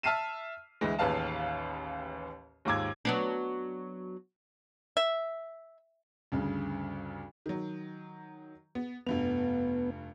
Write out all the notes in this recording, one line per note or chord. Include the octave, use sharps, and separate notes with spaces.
E5 A5 F6 C7 D#7 E7
D2 E3 G#3
A1 D#2 G#4 B4 F5 A5
D#2 G#2 F4 D6 E6 G#6
F#3 B3 D4
E5
D2 G2 C#3
D#3 F#3
B3
F1 G2 B3 F7